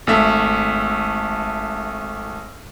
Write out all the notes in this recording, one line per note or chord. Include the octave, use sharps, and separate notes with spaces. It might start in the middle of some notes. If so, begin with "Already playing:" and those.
G#1 A3 E5